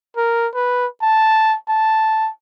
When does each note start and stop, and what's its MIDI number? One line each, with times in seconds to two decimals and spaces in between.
0.17 0.48 70
0.54 0.87 71
1.02 1.55 81
1.68 2.30 81